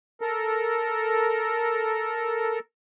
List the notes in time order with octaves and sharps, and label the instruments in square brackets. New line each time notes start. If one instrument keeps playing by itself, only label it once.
[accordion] A4 A#4